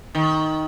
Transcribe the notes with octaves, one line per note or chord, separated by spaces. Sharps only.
D#3